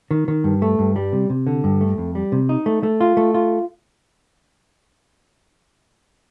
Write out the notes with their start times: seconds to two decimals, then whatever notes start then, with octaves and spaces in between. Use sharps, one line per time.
0.11 D#3
0.28 D#3
0.44 G2
0.62 A3
0.79 G2
0.96 G3
1.12 C3
1.30 C3
1.47 D3
1.64 G2
1.81 A3
1.98 F2
2.15 G3
2.32 C3
2.49 D#4
2.66 A3
2.83 A3
3.01 F4
3.17 A3
3.34 F4